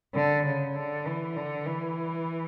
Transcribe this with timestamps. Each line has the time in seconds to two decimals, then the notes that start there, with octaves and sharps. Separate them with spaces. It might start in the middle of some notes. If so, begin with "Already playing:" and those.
0.15 D3
0.46 C#3
0.75 D3
1.06 E3
1.36 D3
1.66 E3